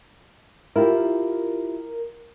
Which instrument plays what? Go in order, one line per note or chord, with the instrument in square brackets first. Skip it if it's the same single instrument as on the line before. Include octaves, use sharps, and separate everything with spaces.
[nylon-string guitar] E4 F4 G4 [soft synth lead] A#4